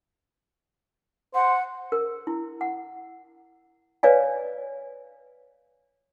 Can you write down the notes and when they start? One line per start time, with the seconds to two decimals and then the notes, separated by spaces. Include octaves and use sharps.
1.34 C5 F#5
1.92 A#4
2.27 E4
2.61 F#5
4.03 B4 C#5 D5 F5 G#5